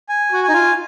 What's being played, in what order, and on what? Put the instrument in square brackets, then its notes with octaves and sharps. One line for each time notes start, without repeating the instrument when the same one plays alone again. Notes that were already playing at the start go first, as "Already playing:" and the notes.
[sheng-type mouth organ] G#5
[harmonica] F#4
[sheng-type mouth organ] G#5
[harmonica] D#4
F4